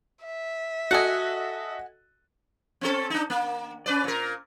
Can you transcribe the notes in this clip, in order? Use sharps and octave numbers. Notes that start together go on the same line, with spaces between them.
E5
F#4 A4 D#5 F#5 G#5
C4 C#4 A4
D4 D#4
A#3
C#4 B4 D5
A#2 A#4